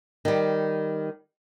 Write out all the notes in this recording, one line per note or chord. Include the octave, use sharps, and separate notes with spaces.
D#3 G3